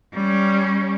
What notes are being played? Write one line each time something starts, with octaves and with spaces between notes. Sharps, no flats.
G3 C#4